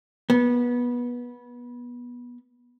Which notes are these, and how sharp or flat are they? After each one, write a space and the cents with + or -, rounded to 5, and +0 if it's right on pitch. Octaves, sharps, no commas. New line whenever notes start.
B3 -20